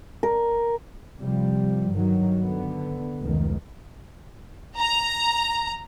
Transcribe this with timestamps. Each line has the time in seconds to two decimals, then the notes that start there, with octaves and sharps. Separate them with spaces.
0.23 A#4
1.19 C3 F3 G3
1.90 G2 D#3 F#3
2.40 D3 B3
3.21 F1 C#2 D#3
4.76 A#5